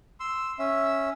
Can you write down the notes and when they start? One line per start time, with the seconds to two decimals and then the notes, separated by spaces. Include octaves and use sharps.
0.20 C6 E6
0.59 C#4 E5